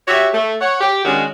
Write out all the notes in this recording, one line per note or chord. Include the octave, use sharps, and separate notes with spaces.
F#4 G4 C#5 E5
A3
C#5 F#5
G4
D#3 G#3 C#4 D4 F#4